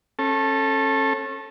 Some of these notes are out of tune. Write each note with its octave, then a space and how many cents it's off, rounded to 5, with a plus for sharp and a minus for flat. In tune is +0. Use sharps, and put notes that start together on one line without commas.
C#4 -35 A4 +0